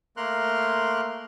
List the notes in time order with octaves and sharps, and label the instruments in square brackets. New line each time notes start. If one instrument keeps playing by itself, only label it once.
[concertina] A3 A#3 A#4 C6 F6 F#6